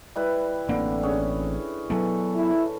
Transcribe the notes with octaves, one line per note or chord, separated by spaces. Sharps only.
G3 E4 B4
A1 D3 A#3 C4
C#4 G#4
E3 F#3 B3 A4
E4